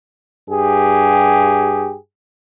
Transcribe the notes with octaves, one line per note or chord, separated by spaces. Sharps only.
G2 G4 G#4